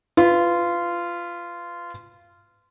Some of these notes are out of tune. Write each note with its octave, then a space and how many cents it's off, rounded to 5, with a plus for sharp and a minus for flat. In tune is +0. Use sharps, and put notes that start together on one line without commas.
F4 -15 B4 +20